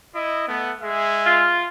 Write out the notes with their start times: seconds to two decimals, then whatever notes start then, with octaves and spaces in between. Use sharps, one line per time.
0.15 E4 D#5
0.48 A3 B3
0.82 G#3 G#4 E5
1.24 F4